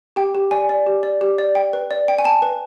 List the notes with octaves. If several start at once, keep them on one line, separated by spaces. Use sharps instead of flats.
G4 G5
G4
D5 G#5
D5
G4
D5
G4
D5
G5
B4
D5
G5
G#5
G5 A5
B4